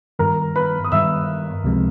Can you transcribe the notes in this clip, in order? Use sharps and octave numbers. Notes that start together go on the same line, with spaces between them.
G2 D#3 G3 A#4 A#5
B4 B5
D#6
G2 D#3 G3 E5 E6
C#2 C3 F3 G#3 C4